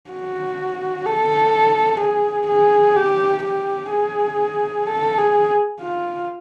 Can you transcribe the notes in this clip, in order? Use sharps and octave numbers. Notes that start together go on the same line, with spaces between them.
F#4
A4
G#4
G#4
G4
G4
G#4
A4
G#4
F4